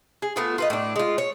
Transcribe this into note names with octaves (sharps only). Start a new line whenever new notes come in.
G#4
A3 B3 F4
F4 B4 D#5
A2 D4
G#3 F4
C#5